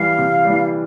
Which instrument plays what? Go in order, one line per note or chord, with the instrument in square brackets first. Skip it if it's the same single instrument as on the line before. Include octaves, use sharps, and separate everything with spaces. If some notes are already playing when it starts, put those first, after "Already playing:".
Already playing: [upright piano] E3 G3 [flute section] F5
[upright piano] C3
E3 G3